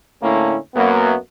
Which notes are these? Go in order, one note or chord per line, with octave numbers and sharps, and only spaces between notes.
A2 D3 A3 A#3 C#4 E4
F#2 A#3 B3